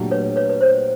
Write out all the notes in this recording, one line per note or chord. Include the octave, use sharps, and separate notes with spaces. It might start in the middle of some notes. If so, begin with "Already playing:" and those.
Already playing: A#2 F#3 A3 D4 G4
B4 C#5
B4 C#5
B4
C5